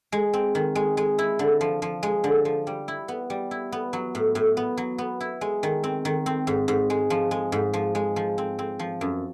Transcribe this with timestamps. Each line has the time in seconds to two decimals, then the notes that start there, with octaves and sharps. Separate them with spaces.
0.12 G#3
0.34 C4
0.55 D#3
0.75 G#3
0.97 G#3
1.19 E4
1.39 D3
1.61 F3
1.82 F3
2.03 G#3
2.24 D3
2.45 F3
2.67 G3
2.88 E4
3.08 B3
3.30 G3
3.51 E4
3.72 B3
3.93 F#3
4.15 A2
4.35 A2
4.57 B3
4.77 F#3
4.98 B3
5.21 E4
5.41 G#3
5.63 D#3
5.84 C4
6.05 D#3
6.26 C4
6.47 G#2
6.68 G#2
6.90 G#3
7.10 F3
7.31 G#3
7.52 G#2
7.73 F3
7.95 G#3
8.16 F3
8.38 C4
8.59 C4
8.79 F3
9.01 F#2